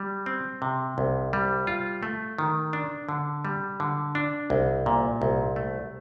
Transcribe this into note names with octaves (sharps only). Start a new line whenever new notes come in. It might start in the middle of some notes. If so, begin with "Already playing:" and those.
Already playing: G3
C4
C3
C2
G3
F4
A3
D#3
D4
D3
G3
D3
D4
C2
A#2
C2
A3